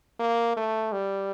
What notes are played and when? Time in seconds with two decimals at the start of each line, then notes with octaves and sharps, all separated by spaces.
0.20 A#3
0.57 A3
0.92 G3